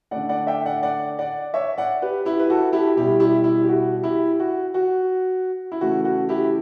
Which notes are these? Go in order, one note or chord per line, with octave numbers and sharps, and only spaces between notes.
D3 A3 D5 F#5
D5 F#5
E5 G5
D5 F#5
D5 F#5
D5 F#5
C#5 E5
D5 F#5
G4 B4
E4 G4
B4
F#4 A4
E4 G4
B2 G3 E4 G4
E4 G4
E4
G4
F#4
E4 G4
F#4
F#4
E4
C#3 E3 A3 F#4
F#4
E4 G4